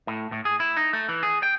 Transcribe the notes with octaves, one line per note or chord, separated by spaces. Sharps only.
A2
A2
G#4
E4
D#4
A3
E3
G#4
G5